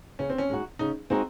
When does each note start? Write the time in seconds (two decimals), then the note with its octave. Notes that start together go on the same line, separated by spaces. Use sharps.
0.19 C#3 C#4
0.30 C4
0.38 C#4
0.50 G#3 D#4 F#4
0.79 C#3 D#4
1.10 G#3 C4 D#4 F#4